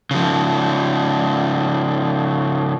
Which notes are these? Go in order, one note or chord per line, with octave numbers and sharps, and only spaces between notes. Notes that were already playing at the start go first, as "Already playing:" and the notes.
C#3 F3